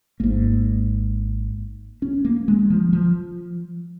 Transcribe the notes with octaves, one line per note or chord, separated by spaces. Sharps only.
G#1 G#2 A#3
C#4
A#3
G#3
F3
F3